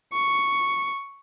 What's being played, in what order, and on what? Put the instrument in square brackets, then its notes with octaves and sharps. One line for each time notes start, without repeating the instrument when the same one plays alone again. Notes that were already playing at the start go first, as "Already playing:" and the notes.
[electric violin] C#6